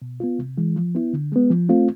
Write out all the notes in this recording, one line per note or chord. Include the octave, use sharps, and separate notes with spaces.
B2
B3 F4
C3
E3 G#3
F3
B3 E4
D3
G#3 B3
F3
A3 C4 F4